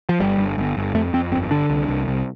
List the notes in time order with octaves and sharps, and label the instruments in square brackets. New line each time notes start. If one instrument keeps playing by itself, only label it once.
[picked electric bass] F3
G1 G3
G1
G1
G1
F2 A3
F2 C4
G1 C4
D3 D4
C2
C2
C2